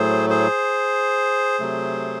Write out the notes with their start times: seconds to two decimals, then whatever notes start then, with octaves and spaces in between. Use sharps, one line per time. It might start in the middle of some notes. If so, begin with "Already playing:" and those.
Already playing: A2 F#3 A3 G#4 C5
0.30 G#4 C5
1.60 C3 F#3 A3